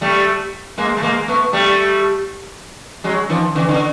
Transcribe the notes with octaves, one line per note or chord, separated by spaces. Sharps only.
G3 A3
G#3 A#3
A3
G#3 A#3
A3 B3
G3 A3
F#3 G#3
D#3 F3
D3 E3
D3